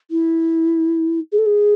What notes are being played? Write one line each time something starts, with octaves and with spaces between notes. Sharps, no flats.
E4
G#4
A4
G#4